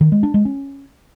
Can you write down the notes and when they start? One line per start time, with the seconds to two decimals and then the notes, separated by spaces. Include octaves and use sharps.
0.01 D#3
0.12 G#3
0.23 D4
0.34 G#3
0.45 C#4